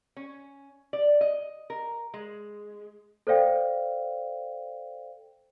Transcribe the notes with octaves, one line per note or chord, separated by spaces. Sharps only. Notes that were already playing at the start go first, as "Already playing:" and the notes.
C#4
D5
D#5
A#4
G#3
A4 C5 D5 F5 G5